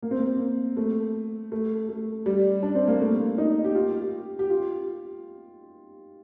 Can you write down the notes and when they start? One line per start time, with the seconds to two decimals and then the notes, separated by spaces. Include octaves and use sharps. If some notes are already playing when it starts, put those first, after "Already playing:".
0.02 A#3
0.11 C4
0.19 A#3
0.77 A3
1.52 A3
1.89 A3
2.26 G3
2.63 D4
2.75 C4
2.87 A#3
3.00 A3
3.19 A#3
3.38 D#4
3.64 G4
3.75 F4
3.93 G4
4.39 G4
4.50 F4